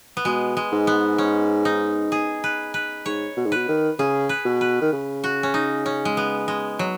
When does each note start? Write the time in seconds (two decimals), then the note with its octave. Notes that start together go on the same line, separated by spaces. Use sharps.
0.17 B3
0.25 B2 G#3
0.57 G#3
0.72 G#2
0.87 B3
1.18 C#4
1.65 D#4
2.12 G#4
2.44 B4
2.74 B4
3.06 G#2 C#5
3.37 B2
3.46 G#2
3.52 B2 B4
3.68 D#3
3.99 C#3 G#4
4.29 B4
4.45 B2
4.61 B4
4.81 D#3
4.93 C#3
5.24 F#4
5.43 C#4
5.54 D#4
5.86 C#4
6.05 G#3
6.17 B3
6.48 G#3
6.79 F#3